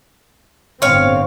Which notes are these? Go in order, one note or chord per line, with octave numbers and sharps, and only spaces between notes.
G1 A2 C4 C#5 F5